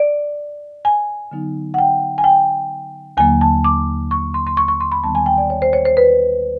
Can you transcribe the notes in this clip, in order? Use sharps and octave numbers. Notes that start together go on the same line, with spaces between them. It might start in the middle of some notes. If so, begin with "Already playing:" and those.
Already playing: D5
G#5
D3 F#3 B3 D#4
F#5
G5
G#5
G5
D#2 D3 F#3 A#3 G#5
A5
D6
C#6
C6
C6
C#6
C#6
C6
B5
D#2 D#3 G3 B3 A5
G#5
G5
D5
C#5
C5
C#5
C5
B4